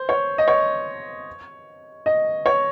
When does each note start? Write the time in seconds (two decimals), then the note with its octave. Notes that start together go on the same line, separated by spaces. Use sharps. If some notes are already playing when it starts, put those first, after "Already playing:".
Already playing: C5
0.09 C#5
0.38 D#5
0.48 C#5
2.06 D#5
2.46 C#5